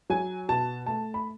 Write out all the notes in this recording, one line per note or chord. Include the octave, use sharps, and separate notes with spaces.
F#3 G#5
B2 A5
A3 A5
B5